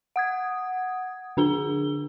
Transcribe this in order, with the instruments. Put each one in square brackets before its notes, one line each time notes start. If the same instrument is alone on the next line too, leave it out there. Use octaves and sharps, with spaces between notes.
[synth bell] F#5 D#6 G#6
D3 D4 G#4 G7